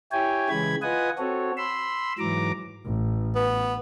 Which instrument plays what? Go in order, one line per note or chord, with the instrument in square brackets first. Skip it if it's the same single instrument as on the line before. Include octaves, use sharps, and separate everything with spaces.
[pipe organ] E4 G4 C#5 G5 G#5
C#3 E3 G#3 B5 G#6
F4 B4 D#5 F#5 G#5 D#6
C4 F#4 A4 C#5
B5 C6 E6
G#2 E3 F#3 A#5 D6
[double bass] A1
[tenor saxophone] B3